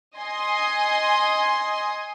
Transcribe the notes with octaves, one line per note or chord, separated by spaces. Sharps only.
D#5 G#5 C6 D#6